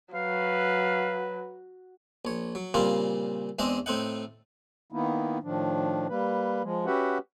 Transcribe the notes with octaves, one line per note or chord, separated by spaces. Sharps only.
F#3 B4 F5
A#1 C#5
F#3
A#2 C#3 G3 C4 F4 A#4
E2 G#3 C4 D4 D#5
A2 C4 D#4 F#5
D#3 A#3 B3 D#4 E4
A2 D#3 F3 D4
G3 A#3 B4
F3 G#3
C#4 F#4 G4 B4 E5 F#5